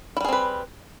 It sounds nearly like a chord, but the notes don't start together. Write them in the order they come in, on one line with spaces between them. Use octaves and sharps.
E4 G3 G#4 C4 B4